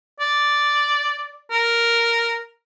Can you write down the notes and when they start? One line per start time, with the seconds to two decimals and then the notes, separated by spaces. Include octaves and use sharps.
0.20 D5
1.51 A#4